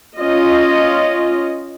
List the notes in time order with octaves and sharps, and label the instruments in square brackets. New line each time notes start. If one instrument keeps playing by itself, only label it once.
[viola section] C#4 F4 D#5